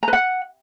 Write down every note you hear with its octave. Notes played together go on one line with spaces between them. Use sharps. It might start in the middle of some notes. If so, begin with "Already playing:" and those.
A#5
B4
F#5